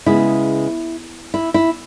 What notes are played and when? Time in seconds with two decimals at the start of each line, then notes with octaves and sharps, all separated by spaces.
0.06 C#3 G#3 B3 E4
1.34 E4
1.54 E4